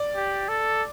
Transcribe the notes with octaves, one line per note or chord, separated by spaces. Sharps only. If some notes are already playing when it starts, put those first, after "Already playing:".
Already playing: D5
G4
A4